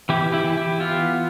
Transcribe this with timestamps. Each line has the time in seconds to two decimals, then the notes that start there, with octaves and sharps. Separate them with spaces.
0.09 E3 E4 G4
0.33 E4 G4
0.44 E3
0.57 E4 G4
0.81 B3 F4